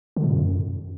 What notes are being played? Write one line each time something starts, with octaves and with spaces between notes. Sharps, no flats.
D3
A#2
F#2